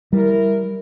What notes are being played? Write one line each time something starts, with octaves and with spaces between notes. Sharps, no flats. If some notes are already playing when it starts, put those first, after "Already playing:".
G3 E4 A#4